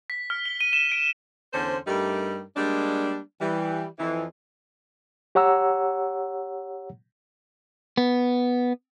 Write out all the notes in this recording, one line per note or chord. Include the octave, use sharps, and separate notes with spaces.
B6
F6
G7
D#7
E7
D7
E2 D3 C#4 C5
G2 G3 A3 D#4 G4 A#4
G3 G#3 A#3 D4
E3 G3
F2 E3
G4 C#5 F#5 A#5 E6
B3